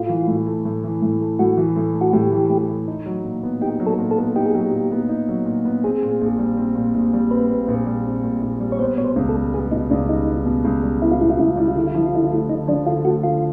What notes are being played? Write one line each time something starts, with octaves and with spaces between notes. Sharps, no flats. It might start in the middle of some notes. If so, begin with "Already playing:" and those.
Already playing: A2 F4
E3
A2
A3
A2
E3
A2
A3
A2 F#4
E3
A2
A3
F#4
A2 G4
E3
A2
A3
D#4
F#3
A#2
B3
D#4 G4
F#3
A4
A#2
A4
B3
D#4 G4
G#4
F#3 G4
A#2
B3
D#4
F#3
A#2
B3
C4 G#4
A#2
A#1
G3
C4
A#2
A#1
G3
C4 B4
A#2
A#1
G3
C4
A#2
A#1
G3
C#5
B3 C5
B2 C#5
C5
C#2
A4
G3
B3 G#4
B2 D#4
C#2 D4
G3 D#4
B3
B2
C#2
G3
B3 E4
F4
B2 E4
F4
C#2 E4
F4
G3 E4
F4
D3 E4
F4
F3 E4
F4
D3 E4
F4
A3 E4
D3 D#4
F3 D4
D3 F4
A3 F#4
D3 F4